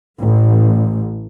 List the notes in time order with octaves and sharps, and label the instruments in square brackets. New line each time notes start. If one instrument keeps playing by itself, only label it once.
[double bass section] A1